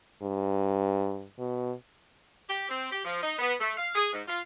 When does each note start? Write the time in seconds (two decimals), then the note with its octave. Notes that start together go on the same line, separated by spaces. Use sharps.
0.23 G2
1.39 B2
2.48 G4
2.69 C4
2.91 G4
3.05 F3
3.22 D#4
3.39 B3
3.59 A3
3.78 F5
3.95 G#4
4.12 G#2
4.27 F4